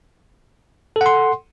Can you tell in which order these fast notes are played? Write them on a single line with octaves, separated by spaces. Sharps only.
A4 F#5 C6